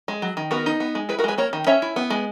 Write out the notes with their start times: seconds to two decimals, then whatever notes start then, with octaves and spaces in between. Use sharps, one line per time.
0.08 G#3
0.22 F#3
0.37 D#3
0.51 B3 F#4 A#4
0.66 D#4
0.80 B3
0.95 G#3
1.09 E4 G#4 B4
1.19 F#4 A#4
1.24 G#3 G#4 B4
1.38 A#3 A#4 C#5
1.53 D#3
1.67 C#4 C#5 E5
1.82 E4
1.96 B3
2.10 G#3